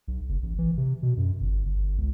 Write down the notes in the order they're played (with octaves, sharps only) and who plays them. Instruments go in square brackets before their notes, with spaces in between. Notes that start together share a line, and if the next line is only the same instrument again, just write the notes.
[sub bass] B1
F#1
A1
E3
C3
B2
F#2
G1
G1
C#2